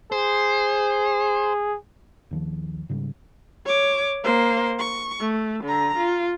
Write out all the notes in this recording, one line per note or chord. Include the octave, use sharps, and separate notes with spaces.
G#4 C5
D#2 D#3 F3
G#2 C#3 G3
C#5 D6
A#3 C5
C#6
A3
D3 A#5
F4